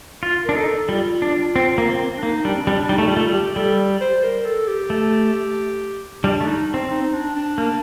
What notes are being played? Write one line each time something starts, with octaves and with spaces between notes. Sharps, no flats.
F4
D4 A#4
D#4 A4
G3 F4
D4
C4
A#3
C4
D4
A#3 D#4
G3 D4
C4
G3 D4
G3 D#4
A3
G3
A3 F4
G3
G4
G3 A4
C5
A#4
A4
G4
A3
G3 D4
A3
D#4
C4
D#4
D4
D4
A#3